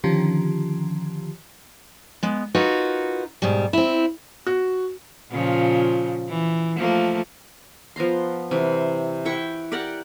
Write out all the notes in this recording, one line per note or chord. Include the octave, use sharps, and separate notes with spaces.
D3 D#3 F3 C#4 F4 G4
G#3 B3
D#4 F4 F#4 A#4 B4
G#2 B2 G3
C4 E4
F#4
A#2 C#3 F3
E3
F3 A3 A#3
F3 B3 A#5 C6
C3 E3 G3
E4 F#5 G5 C#6
G4 A#4 D5 F#5